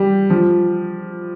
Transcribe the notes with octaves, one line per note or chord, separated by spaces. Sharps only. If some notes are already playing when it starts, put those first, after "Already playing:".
Already playing: G3
F3